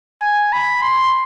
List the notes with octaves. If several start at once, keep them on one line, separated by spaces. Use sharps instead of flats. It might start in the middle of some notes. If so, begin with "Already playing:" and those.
G#5
B5
C6